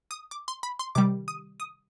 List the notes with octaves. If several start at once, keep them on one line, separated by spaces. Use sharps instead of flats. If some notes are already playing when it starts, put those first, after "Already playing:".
D#6
D6
C6
B5
C6
C3 D#3 G3 D6
D#6
D#6